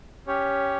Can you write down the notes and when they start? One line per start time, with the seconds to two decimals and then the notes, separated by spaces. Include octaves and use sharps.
0.27 C#4 G4 C#5